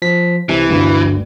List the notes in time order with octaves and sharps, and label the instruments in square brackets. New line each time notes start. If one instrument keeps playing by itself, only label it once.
[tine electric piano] F3 B6
[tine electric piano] C2 C3 [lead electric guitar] E3
[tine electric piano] G1 D2 G2